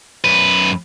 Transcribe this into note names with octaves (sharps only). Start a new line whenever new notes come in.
F#2 B4